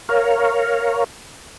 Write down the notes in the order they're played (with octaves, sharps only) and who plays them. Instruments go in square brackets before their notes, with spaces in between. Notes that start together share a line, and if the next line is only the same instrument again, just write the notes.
[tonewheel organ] A#4 C#5 F5